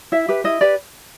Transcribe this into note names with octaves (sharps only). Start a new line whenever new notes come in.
E4 E5
G4 B4
E4 D#5
G4 B4 D5